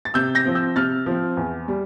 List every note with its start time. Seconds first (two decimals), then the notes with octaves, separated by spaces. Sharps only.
0.05 A6
0.14 C3 E6 G6
0.35 G6 A#6
0.45 F3 C4
0.55 E6 G6
0.76 C3 F6 A6
1.06 F3 C4
1.37 E2
1.68 G3